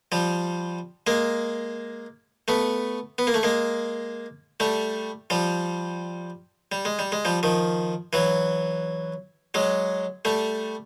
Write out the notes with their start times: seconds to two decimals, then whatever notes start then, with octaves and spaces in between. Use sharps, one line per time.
0.12 F3 G3
1.07 G#3 A#3
2.48 A3 B3
3.18 B3
3.27 A#3
3.34 A3
3.43 G#3 A#3
4.60 G3 A3
5.30 F3 G3
6.72 G3
6.85 G#3
6.99 G3
7.12 G#3
7.25 F3 G3
7.43 D#3 F3
8.13 E3 F#3
9.54 F#3 G#3
10.25 G3 A3